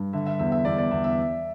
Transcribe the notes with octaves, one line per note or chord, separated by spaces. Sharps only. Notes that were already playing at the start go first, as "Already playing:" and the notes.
Already playing: G2
D3 E5
E5
E2 E5
E5
E2 D5
D5
E2 E5
E5